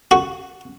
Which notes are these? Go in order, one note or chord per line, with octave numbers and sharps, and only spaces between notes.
F#4